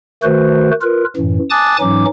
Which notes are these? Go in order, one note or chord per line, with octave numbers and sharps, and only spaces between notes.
D#3 A3 F#4 B4 C5
F4 A#4 B4
F#2 A2 E3
G#5 A5 D6 D#6 F#6 A6
G#2 E3 F#3 C#4 D#4 D6